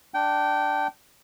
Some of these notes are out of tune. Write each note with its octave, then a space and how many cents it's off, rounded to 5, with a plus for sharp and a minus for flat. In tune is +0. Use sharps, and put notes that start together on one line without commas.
D4 +0 G5 -20